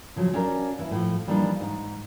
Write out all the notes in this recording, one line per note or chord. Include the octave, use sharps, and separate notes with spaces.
C#3 F3 F#3 C#4
C#4 D4 F4 F#4 A#4
E3 E4
A2 F3
E3 F3 G3 A#3 D4 D#4
G#2 D#4